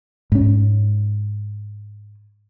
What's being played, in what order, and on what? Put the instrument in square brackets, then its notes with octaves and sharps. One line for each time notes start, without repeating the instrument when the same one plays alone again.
[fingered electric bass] G#2 C#4